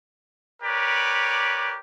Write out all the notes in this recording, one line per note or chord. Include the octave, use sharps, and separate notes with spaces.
G4 A#4 B4 C#5 D5